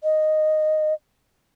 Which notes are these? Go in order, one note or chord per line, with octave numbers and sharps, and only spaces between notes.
D#5